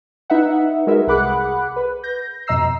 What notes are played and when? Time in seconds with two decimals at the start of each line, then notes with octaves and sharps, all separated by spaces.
0.30 D#4 B4 E5 F#5
0.87 G#3 F#4 G#4 A#4 B4 E5
1.07 C2 G#4 F#5 B5 D6 F#6
1.76 B4
2.03 G6 A#6
2.47 F2 B2 D#5 A#5 E6 C7